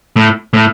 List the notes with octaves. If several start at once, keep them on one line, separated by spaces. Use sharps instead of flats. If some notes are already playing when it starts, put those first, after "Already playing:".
A2
A2